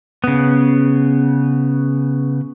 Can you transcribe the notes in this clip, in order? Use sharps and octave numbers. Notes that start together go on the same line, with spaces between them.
C#3 B3